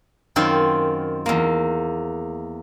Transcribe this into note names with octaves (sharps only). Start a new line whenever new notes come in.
F#2 D#3 C4 F4 C5
E2 A#3